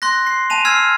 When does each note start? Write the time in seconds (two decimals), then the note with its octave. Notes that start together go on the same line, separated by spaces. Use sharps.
0.02 C6 F#6 A#6
0.27 C7
0.50 G#5 A5 D#7 F7
0.65 E6 F6 G#6 C7